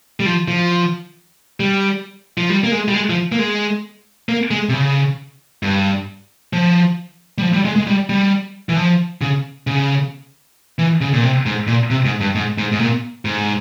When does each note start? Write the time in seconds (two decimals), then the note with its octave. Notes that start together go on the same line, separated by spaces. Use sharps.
0.20 G3
0.26 F3
0.48 F3
1.60 G3
2.38 F3
2.49 G3
2.64 A#3
2.72 G#3
2.88 G3
2.94 G#3
3.10 F3
3.32 A#3
3.39 G#3
4.29 A#3
4.51 G#3
4.69 C3
4.73 C#3
5.63 G2
6.53 F3
7.38 G3
7.42 F3
7.54 G3
7.65 G#3
7.76 G#3
7.87 G3
8.09 G3
8.69 E3
8.77 F3
9.21 C#3
9.67 C#3
10.79 E3
11.01 C#3
11.13 A#2
11.23 C3
11.46 G#2
11.67 A#2
11.90 C3
12.05 G#2
12.21 G2
12.35 G#2
12.58 G#2
12.72 G#2
12.80 A#2
13.25 G#2